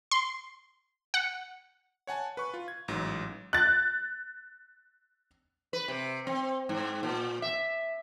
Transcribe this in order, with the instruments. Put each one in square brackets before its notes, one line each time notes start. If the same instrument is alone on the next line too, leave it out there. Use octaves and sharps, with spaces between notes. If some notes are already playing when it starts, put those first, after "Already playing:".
[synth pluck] C6
F#5
[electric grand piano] C#5 F#5 G#5 A5
B4 C#6
F4
G#6
A1 G#2 F#3
[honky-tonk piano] F#6 A6
[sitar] B4
C3
C4
G#2
A#2
E5